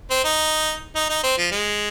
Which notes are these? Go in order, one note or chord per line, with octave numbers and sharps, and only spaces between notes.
C4
D#4
D#4
D#4
C4
F3
G#3